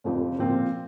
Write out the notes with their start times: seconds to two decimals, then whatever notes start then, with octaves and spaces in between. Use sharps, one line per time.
0.04 F1 F2 F3
0.38 A#2 F3 C4 F4